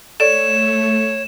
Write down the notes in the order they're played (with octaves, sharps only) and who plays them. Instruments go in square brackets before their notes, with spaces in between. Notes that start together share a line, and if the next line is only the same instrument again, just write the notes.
[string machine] A3 [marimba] A4 D5 [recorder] C#5 [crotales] E7